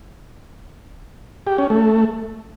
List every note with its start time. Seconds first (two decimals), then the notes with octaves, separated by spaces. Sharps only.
1.47 G4
1.58 C#4
1.70 A3